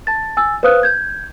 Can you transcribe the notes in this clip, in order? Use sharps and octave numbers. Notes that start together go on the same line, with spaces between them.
A5 A6
G#5 E6 A6
B4 C5 F5 D#6 F6 F#6
G6 G#6